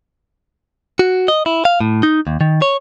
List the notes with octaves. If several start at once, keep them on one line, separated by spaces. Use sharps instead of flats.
F#4
D#5
E4
F5
A2
D#4
D#2
D#3
C#5